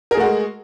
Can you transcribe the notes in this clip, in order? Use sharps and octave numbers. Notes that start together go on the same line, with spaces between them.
G#3 A3 F#4 G#4 A#4